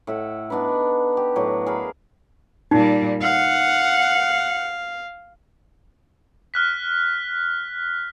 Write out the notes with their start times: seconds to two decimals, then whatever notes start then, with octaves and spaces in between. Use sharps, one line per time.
0.07 A2 E5 F#5
0.50 B3 D4 D#4 B4
1.17 G4
1.35 A2 F#3 D5
1.66 G#4 A#4 F5 B5
2.71 A#2 G3 D#4
3.22 F5 F#5
6.54 F6 F#6 B6